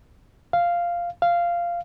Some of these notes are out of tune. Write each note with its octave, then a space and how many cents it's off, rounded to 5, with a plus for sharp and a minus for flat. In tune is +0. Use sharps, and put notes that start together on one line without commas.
F5 -5
F5 -10